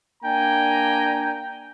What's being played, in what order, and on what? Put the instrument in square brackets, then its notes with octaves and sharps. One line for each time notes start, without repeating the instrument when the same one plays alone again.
[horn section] A#3 D4 G5 G#5 A#5